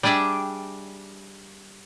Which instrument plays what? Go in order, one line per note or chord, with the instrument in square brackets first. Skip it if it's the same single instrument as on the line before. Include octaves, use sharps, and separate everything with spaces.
[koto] G3 D4 G#4 D5 E5 G5